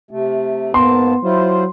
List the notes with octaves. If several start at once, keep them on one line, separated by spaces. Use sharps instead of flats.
C3 A3
G#2 A#3 B3 A5 C6
F#3 E4 F4 C5